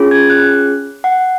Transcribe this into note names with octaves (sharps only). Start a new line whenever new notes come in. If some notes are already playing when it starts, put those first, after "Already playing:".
Already playing: C#4 F4 G#4
G#6
F#6
F#5